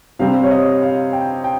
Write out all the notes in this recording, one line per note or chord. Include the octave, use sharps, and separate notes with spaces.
C3 G3 C4 F5
C#5
D#5
F5
G5
G5